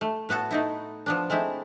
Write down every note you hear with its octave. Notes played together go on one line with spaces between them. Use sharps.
A3
A2 B3 F#4 A4
A3 D#4 E4
F3 B3 D4
G#3 A3 C4 E4